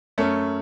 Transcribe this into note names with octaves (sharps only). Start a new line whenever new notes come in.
F#2 A3 C#4